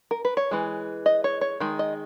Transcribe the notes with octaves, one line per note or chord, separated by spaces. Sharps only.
A#4
B4
C#5
E3 G#3
D#5
C#5
C#5
D#3 G#3
D#5